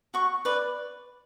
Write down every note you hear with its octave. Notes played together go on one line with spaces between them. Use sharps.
F#4 C#6
B4 D5